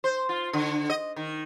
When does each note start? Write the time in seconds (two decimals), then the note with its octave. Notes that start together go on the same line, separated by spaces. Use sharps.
0.04 C5
0.29 F4
0.53 D3
0.90 D#5
1.16 D#3